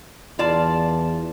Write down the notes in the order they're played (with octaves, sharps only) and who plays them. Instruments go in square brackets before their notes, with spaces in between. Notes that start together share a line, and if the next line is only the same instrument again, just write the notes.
[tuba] E2 [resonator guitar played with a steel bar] F4 D5 A5